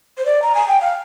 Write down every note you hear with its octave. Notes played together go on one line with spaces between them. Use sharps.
C5
D5
A#5
G#5
G5
F5